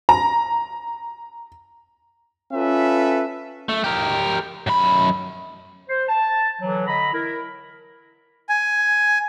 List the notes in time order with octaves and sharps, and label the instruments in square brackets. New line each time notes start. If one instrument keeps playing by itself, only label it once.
[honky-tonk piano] A#5
[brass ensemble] C#4 F4 A4 B4 E5
[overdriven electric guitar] A3
G4 A#4
F#2 B5
[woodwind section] C5
A5
D3 E3 F#3
D3 D#5 A#5 B5
E4 A#4
[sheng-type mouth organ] G#5